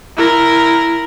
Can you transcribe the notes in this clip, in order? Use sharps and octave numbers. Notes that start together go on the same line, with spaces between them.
E4 A#4